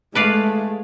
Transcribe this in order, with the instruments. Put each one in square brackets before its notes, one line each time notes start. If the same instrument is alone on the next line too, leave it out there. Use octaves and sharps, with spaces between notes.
[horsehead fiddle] G#3 A3 [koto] B4 D5 F5